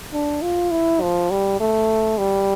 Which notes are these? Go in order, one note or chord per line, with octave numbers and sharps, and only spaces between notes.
D4
F4
E4
F3
G3
A3
G3